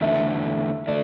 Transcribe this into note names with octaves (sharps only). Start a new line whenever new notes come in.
E2 D3 A3 E5
D3 A3 D5